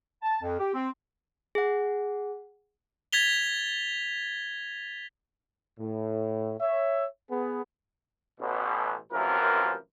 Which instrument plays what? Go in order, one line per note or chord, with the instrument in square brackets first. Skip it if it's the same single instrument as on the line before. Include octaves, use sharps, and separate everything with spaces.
[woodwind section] A5
F2
G4
C4
[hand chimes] G#4 F#5
[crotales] G#6 A6 B6 F7 G7
[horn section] A2
C#5 E5
B3 G#4
[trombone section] A1 B2
A1 F#2 C3 E3 F3 A#4